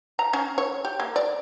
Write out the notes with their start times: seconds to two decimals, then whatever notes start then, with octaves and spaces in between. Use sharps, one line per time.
0.19 A#5
0.33 C#4
0.58 C#5
0.85 G4
1.00 A#3
1.16 D5